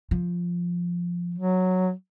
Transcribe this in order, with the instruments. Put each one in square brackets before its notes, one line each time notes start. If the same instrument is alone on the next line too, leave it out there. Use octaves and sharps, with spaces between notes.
[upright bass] F3
[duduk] F#3